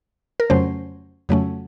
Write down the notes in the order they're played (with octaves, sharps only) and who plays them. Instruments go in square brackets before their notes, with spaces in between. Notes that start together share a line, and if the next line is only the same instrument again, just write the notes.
[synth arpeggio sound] A#4
F2 C#3 F#3 A3 C#4 C5
F2 C#3 F#3 A3 C#4